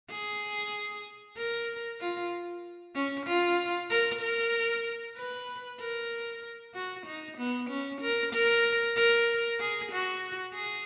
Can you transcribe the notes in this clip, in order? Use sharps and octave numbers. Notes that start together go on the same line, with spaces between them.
G#4
A#4
F4
C#4
F4
A#4
A#4
B4
A#4
F#4
D#4
B3
C#4
A#4
A#4
A#4
G#4
F#4
G#4